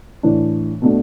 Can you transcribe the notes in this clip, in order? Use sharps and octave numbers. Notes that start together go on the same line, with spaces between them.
A2 E3 D4
B2 A3 D4